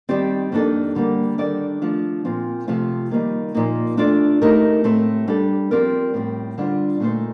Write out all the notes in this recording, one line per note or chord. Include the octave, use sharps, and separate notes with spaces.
D#3 G3 C4 G4 D5
F2 D#3 A#3 D4 A4
D3 G3 A#3
D#3 G3 D4 A4 D5
F3 A3 D4
A#2 F3 C4 F4
C3 F3 A3 C4 F4
D#3 G3 A#3 D#4
A#2 F3 A#3 D#4
A3 D4 F4 A4 D5
A3 D#4 G4 A#4
A2 A3 C4
G3 D4 A4
F3 C4 G4 A#4 D5
A2 G3 C4
D3 G3 D4 F4 C5
A#2 A3 D#4 A4 C5